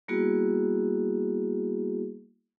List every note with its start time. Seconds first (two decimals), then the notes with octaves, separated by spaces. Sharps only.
0.08 G3 A#3 B3 E4 F#4 G#4